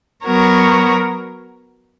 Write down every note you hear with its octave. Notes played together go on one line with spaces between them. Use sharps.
F#3 B3 F#4 A#4 C#5